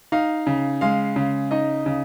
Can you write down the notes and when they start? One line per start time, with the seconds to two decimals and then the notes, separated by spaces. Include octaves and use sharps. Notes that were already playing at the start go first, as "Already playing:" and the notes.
0.12 D#4 F5
0.47 C#3
0.81 G#3 F5
1.16 C#3
1.51 D#4 D#5
1.86 C#3